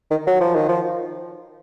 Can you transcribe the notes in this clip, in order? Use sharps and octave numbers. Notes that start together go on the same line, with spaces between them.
D#3
F#3
F3
D#3
F3